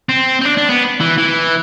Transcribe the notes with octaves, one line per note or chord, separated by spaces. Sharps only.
C4
C4
D4
D4
B3
E3
E3